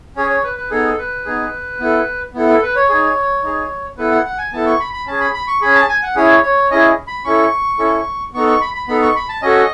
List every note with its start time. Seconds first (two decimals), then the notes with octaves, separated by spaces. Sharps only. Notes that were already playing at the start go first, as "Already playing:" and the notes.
0.16 C#4 G#4 C#5
0.30 C#5
0.44 B4
0.57 B4
0.70 B3 D#4 G#4 A4
0.98 B4
1.25 B3 D#4 G#4
1.80 B3 E4 A4
2.34 B3 E4 A4
2.48 A4
2.62 B4
2.76 C#5
2.89 D#4 G#4
3.43 D#4 G#4
3.97 B3 E4 A4 B4
4.12 F#5
4.25 F#5
4.38 G#5
4.53 B3 E4 A4 A5
4.66 C#6
4.80 B5
4.93 B5
5.07 C#4 G#4 A5
5.21 B5
5.34 B5
5.48 C#6
5.61 C#4 G#4 B5
5.74 A5
5.89 G#5
6.03 F#5
6.15 C#4 E4 G#4 C#5
6.43 C#5
6.71 C#4 E4 G#4 D#5
7.07 B5
7.25 C#4 E4 A4 C#6
7.79 C#4 E4 A4
8.34 B3 D#4 A4 C#6
8.47 C#6
8.61 B5
8.74 B5
8.88 B3 D#4 A4 B5
9.02 C#6
9.16 B5
9.29 A5
9.42 C#4 F#4 A4 D#5